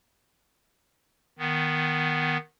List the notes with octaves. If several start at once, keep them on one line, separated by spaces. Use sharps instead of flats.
D#3 B3